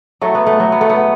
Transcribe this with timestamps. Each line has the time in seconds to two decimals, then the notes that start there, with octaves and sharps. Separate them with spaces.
0.21 F#3 A3
0.35 B3
0.47 A3
0.60 F#3
0.72 B3
0.81 A3
0.90 B3